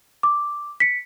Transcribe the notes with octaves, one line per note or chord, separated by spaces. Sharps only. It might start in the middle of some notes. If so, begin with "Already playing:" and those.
D6
B6 C#7